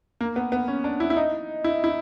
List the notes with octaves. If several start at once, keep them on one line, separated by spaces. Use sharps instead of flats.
A#3
B3
B3
C#4
D4
E4
E4
D#4
E4
E4